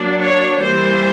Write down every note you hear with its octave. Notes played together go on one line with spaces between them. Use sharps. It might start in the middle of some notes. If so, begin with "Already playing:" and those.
Already playing: F#3 A#3 D4
C#5
E3 G3 A#3 C5